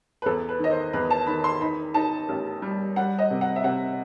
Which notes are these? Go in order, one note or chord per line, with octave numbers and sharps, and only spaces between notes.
B4
E2 A4
B4
D#3 D#5
C5
E2 B4
A5
D#3 B5
C6
D#4 B5
D#4 A5
A1
G3
G3 F#5
D#5
C3
F#5
E5
C3 F#5